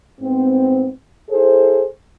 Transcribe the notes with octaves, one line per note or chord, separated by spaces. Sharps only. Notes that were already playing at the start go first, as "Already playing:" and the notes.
G#2 B3 C4
E4 G#4 A4 C5